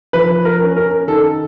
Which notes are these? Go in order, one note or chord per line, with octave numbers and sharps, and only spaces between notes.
F3 B4
A#4
C#4
A#4
D#3 A4